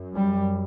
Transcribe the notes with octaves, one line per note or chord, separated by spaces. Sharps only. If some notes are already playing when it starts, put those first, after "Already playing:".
Already playing: F#2
G3